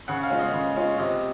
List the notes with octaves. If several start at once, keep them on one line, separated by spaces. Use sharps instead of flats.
C#3 F#5
F5
G#3 C#4 F4
D#5
C#3
G#3 C#4 F4
C3 D#5